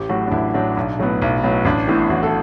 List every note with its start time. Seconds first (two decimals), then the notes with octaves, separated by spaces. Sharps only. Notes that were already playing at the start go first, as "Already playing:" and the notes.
Already playing: A1 G4
0.09 A2 F#3 F#4
0.27 D4
0.32 A1 E4
0.54 A2 F#3 D4
0.77 B1
0.99 A2 F#3 B3
1.22 B1
1.43 A2 F#3 B3
1.65 A1 D4
1.88 A2 E3 B3 E4
2.10 A1 F#4
2.23 A4